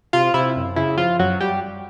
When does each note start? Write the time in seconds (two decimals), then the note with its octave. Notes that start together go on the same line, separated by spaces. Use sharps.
0.13 C3 F4
0.34 C3 E4
0.56 F#2
0.76 C#3 E4
0.98 F3 F4
1.19 F#2 F#3 F#4
1.40 G3 G4